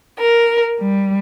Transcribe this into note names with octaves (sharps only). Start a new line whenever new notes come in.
A#4
G3